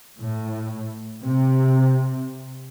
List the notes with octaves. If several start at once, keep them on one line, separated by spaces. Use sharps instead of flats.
A2
C3